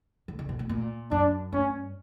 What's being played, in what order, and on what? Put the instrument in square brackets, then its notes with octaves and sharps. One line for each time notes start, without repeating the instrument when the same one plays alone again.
[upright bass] D3
C#3
B2
A#2
A#2
[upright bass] F#2 [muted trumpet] D4
[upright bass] G2 [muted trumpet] C#4